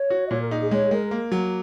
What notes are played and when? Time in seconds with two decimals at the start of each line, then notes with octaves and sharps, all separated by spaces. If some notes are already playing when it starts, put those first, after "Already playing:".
Already playing: C#5
0.10 F#4
0.26 D#5
0.31 A#2 C#5
0.40 A#4
0.51 D#4 G#4
0.61 G#4
0.71 G#3 C#5
0.83 G#4
0.91 G#3 A#4
1.11 A#3
1.32 F#3